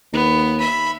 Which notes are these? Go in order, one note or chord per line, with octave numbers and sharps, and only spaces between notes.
D#2 B3
E5 B5